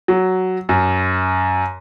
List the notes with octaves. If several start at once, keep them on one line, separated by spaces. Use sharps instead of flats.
F#3
F#2